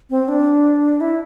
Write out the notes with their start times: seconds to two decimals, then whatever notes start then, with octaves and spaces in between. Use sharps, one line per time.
0.10 C4
0.28 D4
1.01 E4